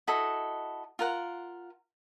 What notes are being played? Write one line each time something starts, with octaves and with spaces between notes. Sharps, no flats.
E4 F#4 A4 D#5
F4 A#4 F#5